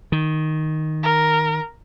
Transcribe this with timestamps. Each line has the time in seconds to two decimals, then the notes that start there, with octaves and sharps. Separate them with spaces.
0.12 D#3
1.03 A#4